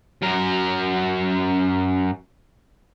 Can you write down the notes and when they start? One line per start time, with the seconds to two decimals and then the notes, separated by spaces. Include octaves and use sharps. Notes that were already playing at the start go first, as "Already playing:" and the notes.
0.22 F#2 A#4